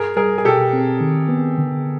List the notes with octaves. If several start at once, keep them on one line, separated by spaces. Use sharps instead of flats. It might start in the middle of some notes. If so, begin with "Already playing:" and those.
Already playing: G2 G#4 A#4
G3 G#4 A#4
G#4
B2 G4 A4
C4
D#3
B3
D3